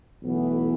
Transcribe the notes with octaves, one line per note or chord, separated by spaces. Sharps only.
B1 A2 E3 B3